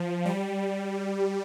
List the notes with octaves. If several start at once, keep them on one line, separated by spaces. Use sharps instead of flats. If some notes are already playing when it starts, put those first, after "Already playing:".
Already playing: F3
G3